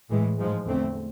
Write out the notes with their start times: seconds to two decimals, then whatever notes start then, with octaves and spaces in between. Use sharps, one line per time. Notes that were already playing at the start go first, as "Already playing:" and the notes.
0.09 A2 E3 G#3
0.38 G#2 F3 G#3
0.67 E2 D3 A3 C4